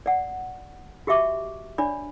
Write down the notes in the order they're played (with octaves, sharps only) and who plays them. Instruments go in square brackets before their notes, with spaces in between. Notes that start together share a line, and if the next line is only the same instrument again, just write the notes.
[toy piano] D5 F#5
F#4 G4 D#5 E5 C#6 D6
D4 C#5 D5 B5